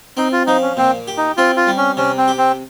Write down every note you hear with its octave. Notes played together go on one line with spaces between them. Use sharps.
C4 D#4
F4
F3 D#4
C#4
A#2 C4
G4
D#4
C4 F4
F4
G3
C#4
C3 C#4
C4
G4
C4